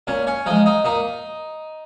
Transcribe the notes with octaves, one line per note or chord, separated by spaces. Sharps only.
A#2 C#4 C#5
C#4 C#5
F3 G#3 D#4 D#5
D#4 D#5
A#2 D#4 D#5